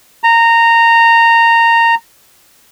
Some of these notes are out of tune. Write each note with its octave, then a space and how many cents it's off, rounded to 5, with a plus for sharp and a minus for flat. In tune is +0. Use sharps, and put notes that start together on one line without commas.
A#5 -15